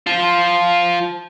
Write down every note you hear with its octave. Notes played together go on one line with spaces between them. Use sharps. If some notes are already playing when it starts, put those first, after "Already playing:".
F3 F4